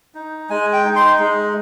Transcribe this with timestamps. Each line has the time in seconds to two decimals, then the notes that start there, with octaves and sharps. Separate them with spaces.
0.15 D#4
0.50 G#3 G#5
0.73 G5
0.84 D#4
0.96 C6
1.19 G#3